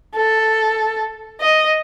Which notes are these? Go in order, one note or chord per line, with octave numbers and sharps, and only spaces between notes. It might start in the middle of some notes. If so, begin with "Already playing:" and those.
A4
D#5